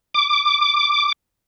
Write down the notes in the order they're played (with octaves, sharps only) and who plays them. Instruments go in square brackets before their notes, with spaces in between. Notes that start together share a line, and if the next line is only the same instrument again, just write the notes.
[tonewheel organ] D6